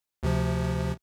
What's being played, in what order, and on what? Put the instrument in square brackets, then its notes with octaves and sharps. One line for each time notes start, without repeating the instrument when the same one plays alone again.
[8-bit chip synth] D2 C3 F3